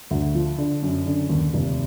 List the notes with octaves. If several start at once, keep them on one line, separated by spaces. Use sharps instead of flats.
D2
F3
D3
F#2
D3
D#2
F1